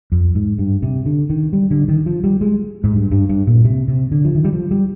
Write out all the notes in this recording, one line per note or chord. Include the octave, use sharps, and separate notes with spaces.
F2
G#2
G2
C3
D3
D#3
G3
D3
D#3
F3
G3
G#3
G#2
G2
G2
G2
A#2
C3
C3
D3
F3
D#3
G3
F3
G3